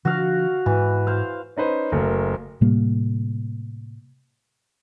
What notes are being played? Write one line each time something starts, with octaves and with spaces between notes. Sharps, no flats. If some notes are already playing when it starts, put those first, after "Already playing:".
D3 F3 D4 F#4 F5
G#2 E3
C5 F5
C#4 D#4 B4 C5
F#1 A3 A#4
A2 C3 G3 A#3